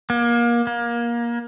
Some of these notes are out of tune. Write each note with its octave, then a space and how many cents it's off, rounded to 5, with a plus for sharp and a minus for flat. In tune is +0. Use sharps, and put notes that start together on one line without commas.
A#3 +30
A#3 +20